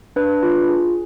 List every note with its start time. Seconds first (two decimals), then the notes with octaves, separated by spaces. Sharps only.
0.16 D4 B4
0.43 F4
0.69 G#4